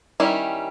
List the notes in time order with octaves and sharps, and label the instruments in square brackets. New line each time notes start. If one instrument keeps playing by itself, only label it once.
[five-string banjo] D#3 G3 C#4 E4